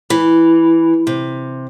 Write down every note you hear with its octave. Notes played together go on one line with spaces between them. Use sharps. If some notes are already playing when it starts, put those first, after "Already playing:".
E3
C3